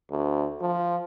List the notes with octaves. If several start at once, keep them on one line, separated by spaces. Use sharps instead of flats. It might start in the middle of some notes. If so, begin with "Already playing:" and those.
D2
F3